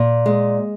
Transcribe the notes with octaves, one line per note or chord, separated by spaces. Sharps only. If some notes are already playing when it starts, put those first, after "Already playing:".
Already playing: A#2
G#3